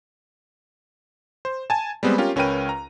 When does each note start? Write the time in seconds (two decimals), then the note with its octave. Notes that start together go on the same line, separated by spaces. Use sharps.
1.45 C5
1.70 G#5 A5
2.03 G3 G#3 B3 C4
2.18 C#4 F4 G4 A#4
2.36 C#2 C#4 A#4 B4 G5 D#7
2.69 A#5